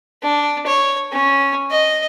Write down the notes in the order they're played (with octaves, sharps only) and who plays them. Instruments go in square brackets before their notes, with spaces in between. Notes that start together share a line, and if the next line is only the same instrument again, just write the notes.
[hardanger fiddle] D4
C#5
C#4
D#5